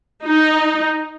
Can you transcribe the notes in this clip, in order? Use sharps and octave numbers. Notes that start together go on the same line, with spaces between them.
D#4